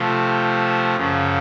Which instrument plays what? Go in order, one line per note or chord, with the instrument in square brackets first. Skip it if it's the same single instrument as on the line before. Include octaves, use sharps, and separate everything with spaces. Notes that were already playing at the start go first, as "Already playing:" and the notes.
Already playing: [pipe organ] C3 F3 A3
F#2 C#3 F3